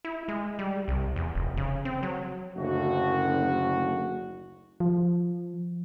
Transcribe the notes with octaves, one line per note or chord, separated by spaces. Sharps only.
E4
G#3
G3
C2
E2
F1
C#3
C4
F#3
F#1 D2 F#4
F3